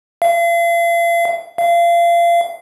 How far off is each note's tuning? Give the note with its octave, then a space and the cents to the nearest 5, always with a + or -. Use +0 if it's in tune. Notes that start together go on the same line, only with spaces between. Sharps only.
F5 -40
F5 -30